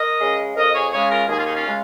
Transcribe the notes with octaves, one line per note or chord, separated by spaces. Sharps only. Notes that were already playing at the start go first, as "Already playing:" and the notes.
Already playing: A#4 D#5
C#3 G#3
F2 A#4 D#5
G#4 C#5
C#3 G#3 G#4 C#5
F4 A#4
D#2 G#4
F4
D#4 G#4
C#4 F4
C#3 G#3